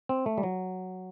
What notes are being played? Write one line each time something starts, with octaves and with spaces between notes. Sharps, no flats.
C4
A3
G3
F#3